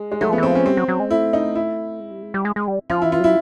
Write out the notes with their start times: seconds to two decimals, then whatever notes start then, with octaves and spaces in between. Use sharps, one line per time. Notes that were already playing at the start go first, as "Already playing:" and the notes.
Already playing: G#3
0.12 G#3
0.21 F#3 A3
0.29 F3 B3
0.38 E3
0.43 C4
0.47 F3
0.55 C#4
0.66 G3 C4
0.77 F#3
0.88 F#3
1.00 G#3
1.10 A3 E4
1.33 D#4
1.55 E4
2.00 G#3
2.11 G3
2.22 G#3
2.34 G3
2.45 G#3
2.56 G#3
2.67 G3
2.90 F3 F4
3.02 E4
3.05 E3
3.12 F4
3.20 F#3 E4